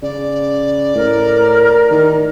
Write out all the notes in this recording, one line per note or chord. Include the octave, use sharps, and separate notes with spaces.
C#3 D5
A2 A#4
D#3